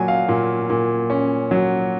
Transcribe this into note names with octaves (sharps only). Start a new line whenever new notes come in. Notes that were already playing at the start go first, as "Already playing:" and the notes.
Already playing: A#2 F#3 C#4 G#5
F5
A#2
A#2
C#4
F#3